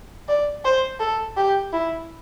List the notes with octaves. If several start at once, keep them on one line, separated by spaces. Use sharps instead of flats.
D5
C5
A4
G4
E4